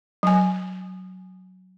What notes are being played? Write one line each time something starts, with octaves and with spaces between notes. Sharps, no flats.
F#3 G#5